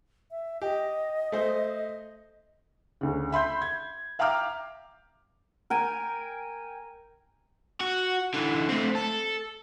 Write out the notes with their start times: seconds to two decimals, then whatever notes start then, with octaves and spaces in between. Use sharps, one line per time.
0.31 E5
0.62 G4 D#5
1.32 A3 C5
3.01 D2 C#3
3.32 E5 B5 C6 G6
3.62 G#6
4.19 E5 F5 G5 A#5 D6 F6
5.70 A#4 G5 G#5
7.80 F#4
8.34 D3 E3
8.69 A3 C4
8.95 A4